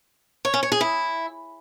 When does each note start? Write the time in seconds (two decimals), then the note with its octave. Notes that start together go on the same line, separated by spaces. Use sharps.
0.45 C#5
0.54 C#4
0.63 C#5
0.72 G#4
0.81 E4